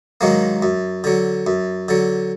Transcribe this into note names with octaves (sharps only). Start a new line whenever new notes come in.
G#2 D#3 F#3 A#3
F#2
D3 F#3
F#2
D3 F#3